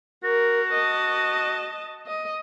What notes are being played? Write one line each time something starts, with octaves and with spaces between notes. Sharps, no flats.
F#4 A#4
D#5 A5
D#5